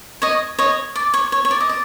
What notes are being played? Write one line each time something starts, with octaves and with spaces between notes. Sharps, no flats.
C#5 D#5
C#5 D#5
D5
C#5
C#5
C#5
D5
D#5
D5